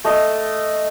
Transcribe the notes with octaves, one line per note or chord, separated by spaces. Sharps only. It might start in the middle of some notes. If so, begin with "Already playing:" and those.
A3 D#5